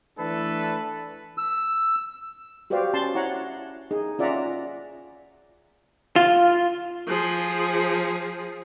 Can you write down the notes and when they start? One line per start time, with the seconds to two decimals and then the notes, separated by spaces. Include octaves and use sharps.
0.18 E3 A3 D4 A4 B4
1.38 E6
2.70 F#4 G4 B4 C5 D5 F5
2.94 C#4 A5 C6
3.15 E4 C#5 F#5 A#5
3.91 D#4 G#4
4.19 C#4 F4 D5 E5 F#5 A#5
6.16 F4
7.08 F3 G#4